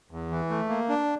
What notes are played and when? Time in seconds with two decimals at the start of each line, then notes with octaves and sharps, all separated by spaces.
0.11 E2
0.31 E3
0.50 A3
0.69 A#3
0.89 D4